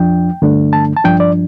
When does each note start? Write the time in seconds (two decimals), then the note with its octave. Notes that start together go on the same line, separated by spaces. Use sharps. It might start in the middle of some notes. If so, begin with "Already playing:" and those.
Already playing: F2 F3 D4 G5
0.42 G2 D3 A3 D4
0.73 A5
0.97 A5
1.04 G2 F3 D4 G5
1.20 D5